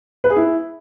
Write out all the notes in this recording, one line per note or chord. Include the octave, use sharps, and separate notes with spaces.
B4
G#4
E4